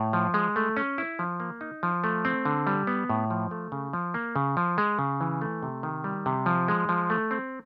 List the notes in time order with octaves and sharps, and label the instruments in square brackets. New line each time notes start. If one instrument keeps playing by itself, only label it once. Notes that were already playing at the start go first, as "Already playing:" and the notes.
Already playing: [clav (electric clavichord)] A2
F3
G#3
A3
C#4
E4
F3
A#3
D#4
F3
A3
C4
D3
G3
B3
A2
F3
A3
C#3
F3
A#3
C#3
F3
G#3
C#3
E3
A3
C3
D#3
G3
C3
F3
G#3
F3
A3
C4